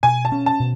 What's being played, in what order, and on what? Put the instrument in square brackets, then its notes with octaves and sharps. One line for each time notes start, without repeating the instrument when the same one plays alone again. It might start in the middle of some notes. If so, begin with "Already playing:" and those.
[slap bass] B2 [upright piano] G#5
[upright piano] A5
[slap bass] C#4
[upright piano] A5
[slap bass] B2